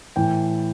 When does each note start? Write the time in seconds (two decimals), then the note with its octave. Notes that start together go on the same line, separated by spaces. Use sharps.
0.16 A2 E3 G5